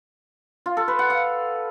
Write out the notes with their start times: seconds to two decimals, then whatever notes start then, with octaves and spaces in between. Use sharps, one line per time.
0.66 F4
0.77 A4
0.88 B4
0.99 F#5
1.10 F5